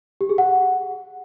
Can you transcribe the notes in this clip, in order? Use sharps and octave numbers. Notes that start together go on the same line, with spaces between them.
G4
G#4
F#5